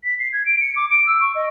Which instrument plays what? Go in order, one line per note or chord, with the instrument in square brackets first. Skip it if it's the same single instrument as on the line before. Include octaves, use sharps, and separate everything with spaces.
[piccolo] B6
C7
G#6
D7
C#7
D6
D7
E6
C#6
D#5